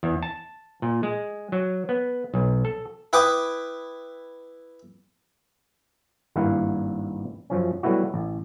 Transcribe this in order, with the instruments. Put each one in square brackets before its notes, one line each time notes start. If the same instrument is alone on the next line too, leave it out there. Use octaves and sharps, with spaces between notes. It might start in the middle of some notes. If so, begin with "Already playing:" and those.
[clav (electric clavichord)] E2
A5
A#2
G#3
F#3
B3
B1
A4
[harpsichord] E4 B4 G5 D6 D#6
[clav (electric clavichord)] G#1 G2 A#3 E4 F5 F#5
F#2 F3 C#4
F#3 G3 A3 B3 E4 F#4
A1